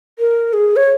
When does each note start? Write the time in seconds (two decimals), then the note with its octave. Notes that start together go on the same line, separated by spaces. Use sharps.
0.19 A#4
0.53 G#4
0.76 C#5